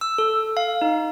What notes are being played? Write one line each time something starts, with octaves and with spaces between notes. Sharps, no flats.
E6
A4
F5
D#4